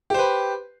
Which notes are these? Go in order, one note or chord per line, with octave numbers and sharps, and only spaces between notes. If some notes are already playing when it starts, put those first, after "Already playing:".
G4 B4 C5